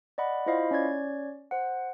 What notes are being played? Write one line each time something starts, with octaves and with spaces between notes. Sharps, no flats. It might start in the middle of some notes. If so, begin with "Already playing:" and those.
D5 D#5 F#5 B5
E4 F4 C5 D#5 F5 B5
C#4 C#5 D5 G#6
C5 F#5